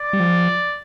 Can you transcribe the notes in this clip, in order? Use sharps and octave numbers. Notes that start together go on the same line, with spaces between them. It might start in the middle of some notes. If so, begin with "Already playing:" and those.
Already playing: D5
G3
F3